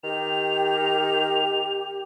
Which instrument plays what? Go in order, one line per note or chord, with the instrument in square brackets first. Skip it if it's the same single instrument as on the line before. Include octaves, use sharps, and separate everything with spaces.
[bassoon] D#3 [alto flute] G4 [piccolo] F7